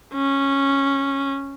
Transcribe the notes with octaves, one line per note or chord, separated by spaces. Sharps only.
C#4